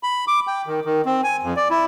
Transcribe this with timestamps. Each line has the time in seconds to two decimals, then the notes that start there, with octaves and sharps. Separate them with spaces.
0.03 B5
0.28 D6
0.47 G5
0.67 D#3
0.85 D#3
1.06 C4
1.24 G#5
1.43 F2
1.56 D5
1.70 E4